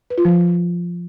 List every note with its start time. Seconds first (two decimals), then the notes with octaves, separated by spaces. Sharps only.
0.10 B4
0.18 F4
0.25 F3